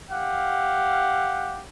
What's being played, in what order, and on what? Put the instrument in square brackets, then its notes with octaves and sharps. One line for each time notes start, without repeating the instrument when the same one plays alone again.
[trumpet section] G4 F5 F#5